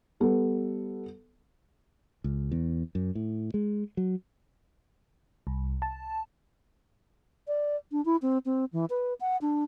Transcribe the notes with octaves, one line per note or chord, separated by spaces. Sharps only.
G3 B3 A4
C#2
E2
F#2
A2
G#3
F#3
C2
A5
D5
D4
E4
C4
C4
E3
B4
F#5
D4